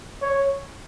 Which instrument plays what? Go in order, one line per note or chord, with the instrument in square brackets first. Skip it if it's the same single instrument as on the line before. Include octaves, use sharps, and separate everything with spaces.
[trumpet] C#5